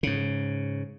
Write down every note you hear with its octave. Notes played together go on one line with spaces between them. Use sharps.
G#2 C#3